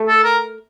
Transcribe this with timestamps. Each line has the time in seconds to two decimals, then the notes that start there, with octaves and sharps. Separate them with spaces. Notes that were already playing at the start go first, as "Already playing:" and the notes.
Already playing: A3
0.08 A4
0.24 A#4